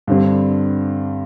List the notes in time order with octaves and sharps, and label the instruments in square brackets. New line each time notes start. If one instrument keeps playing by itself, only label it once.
[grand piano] G2 D3 G3 C4